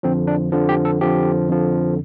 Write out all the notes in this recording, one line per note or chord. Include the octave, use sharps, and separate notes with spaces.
F2 D3 F3 C4
D4
F2 D3 F3
G4
A4
F2 D3 F3 G4
F2 D3 F3